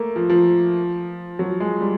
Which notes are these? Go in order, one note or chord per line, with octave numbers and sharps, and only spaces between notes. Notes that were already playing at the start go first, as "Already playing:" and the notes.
Already playing: A3 A#3
F3
F3
F#3
G#3
G3